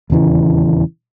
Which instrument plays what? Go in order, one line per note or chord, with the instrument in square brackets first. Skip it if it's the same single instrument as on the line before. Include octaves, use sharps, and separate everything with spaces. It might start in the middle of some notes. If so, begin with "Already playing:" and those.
[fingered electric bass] D#1 E2 C#3 E3